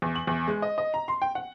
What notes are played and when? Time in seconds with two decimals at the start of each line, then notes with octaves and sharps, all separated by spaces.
0.02 E2
0.15 F#7
0.27 E2
0.47 G#3
0.62 D#5
0.78 D#5
0.94 A#5
1.08 C6
1.22 G5
1.35 F#5